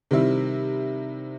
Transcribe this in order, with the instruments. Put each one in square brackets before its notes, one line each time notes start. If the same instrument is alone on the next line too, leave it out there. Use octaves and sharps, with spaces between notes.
[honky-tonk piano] C3 D#3 G3 C4 E4